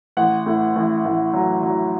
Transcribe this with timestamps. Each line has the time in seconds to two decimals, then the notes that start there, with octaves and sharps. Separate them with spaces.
0.17 A1 F#5
0.46 A2
0.76 A1
1.05 A1
1.33 F#3
1.63 F#3